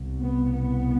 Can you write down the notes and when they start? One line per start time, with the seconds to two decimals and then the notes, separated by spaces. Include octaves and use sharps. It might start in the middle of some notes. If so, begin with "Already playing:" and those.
Already playing: C2 B2
0.22 B3
0.52 B3